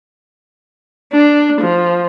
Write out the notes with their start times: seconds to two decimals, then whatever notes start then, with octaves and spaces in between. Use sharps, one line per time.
1.13 D4
1.62 F3